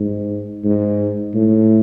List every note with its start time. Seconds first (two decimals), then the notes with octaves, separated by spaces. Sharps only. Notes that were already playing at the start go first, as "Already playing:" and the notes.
Already playing: G#2
0.64 G#2
1.34 A2